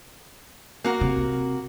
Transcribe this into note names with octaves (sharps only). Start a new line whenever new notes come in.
A#3 F#4 A#4
C3